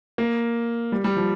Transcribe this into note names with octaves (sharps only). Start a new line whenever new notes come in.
A#3
G3
G3
F3